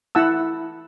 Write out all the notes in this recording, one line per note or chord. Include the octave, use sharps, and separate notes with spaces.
E4 F#5 A5 E6